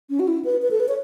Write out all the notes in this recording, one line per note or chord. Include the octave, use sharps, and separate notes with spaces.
C#4
F#4
E4
B4
B4
A4
B4
C#5